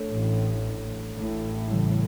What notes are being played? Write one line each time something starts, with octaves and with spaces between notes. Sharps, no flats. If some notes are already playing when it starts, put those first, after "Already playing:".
Already playing: A3 D4 A4 C#5
A1 A2
A1 A2
C#3 E3 G3